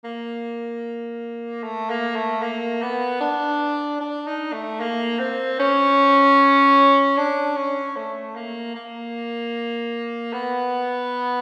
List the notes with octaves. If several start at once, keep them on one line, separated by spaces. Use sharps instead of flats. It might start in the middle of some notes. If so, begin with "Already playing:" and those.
A#3
A3
A#3
A3
A#3
B3
D4
D4
D#4
A3
A#3
C4
C#4
D4
C#4
A3
A#3
A#3
B3